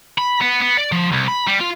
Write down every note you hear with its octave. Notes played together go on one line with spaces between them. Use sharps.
B5
B3
B3
D5
F3
C2
B5
G3
F4